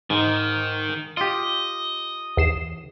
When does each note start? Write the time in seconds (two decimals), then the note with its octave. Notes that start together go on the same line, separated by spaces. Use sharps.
0.10 G#2 D#3
1.17 F4 G4 D#5
2.37 E2 C7 E7